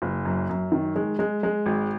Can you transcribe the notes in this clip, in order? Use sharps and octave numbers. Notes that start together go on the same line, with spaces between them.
F#1
F#2
F#2
D#3
G#3
G#3
G#3
G#1